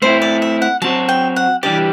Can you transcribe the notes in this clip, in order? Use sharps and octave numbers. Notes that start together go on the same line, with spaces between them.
A3 C4 E4 C5
D5
E5
F#5
F#3 C4 F#4 A5
G5
F#5
E3 G3 D4 G4 D5